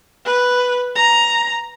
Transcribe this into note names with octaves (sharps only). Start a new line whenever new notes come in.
B4
A#5